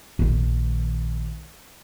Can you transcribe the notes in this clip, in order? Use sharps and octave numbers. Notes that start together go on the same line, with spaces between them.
A#1 D#3